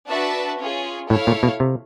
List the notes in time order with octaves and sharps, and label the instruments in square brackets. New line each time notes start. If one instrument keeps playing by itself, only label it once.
[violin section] D4 F#4 B4 E5 A5
C#4 F4 G#4
[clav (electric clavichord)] A2 [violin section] E4 A4 C#5 F5
[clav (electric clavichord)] A#2
B2
C3